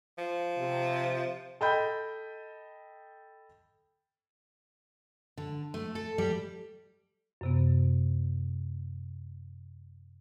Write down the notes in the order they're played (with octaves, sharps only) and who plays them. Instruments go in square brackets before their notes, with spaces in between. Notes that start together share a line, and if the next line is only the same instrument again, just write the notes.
[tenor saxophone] F3
[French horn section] C3
[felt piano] A4 D#5 G5 B5 G6
[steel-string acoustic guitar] D3
A3
A4
G3
[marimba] F#2 C3 B3